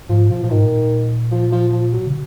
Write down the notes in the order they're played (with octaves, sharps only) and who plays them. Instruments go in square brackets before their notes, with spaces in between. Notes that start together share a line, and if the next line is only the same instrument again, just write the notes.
[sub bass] G#2 [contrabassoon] F3
[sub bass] B2 [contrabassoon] F3
[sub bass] A#2 [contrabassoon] F3
[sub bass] G#2 [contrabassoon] D#3
[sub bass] A#2
[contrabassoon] F3
F3
F3
F#3
[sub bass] C#3